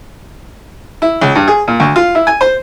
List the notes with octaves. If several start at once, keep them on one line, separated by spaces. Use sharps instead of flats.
E4
C#2
G2
G#4
A#2
D2
F4
E4
G#5
C5